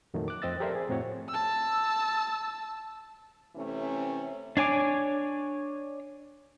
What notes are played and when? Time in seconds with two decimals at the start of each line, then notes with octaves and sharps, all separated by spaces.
0.14 F2 A#2 D#3 F#3 A3
0.28 D6 F#6
0.42 F2 C4 D#5 E6 A6
0.60 G4 A4 A#4 C5 D5 E5
0.75 G#4
0.89 F2 A2 C4 F#4 C#5
1.29 A5 E6
3.56 C3 E3 A3 C#4
4.57 D4 C#5 G#5 D6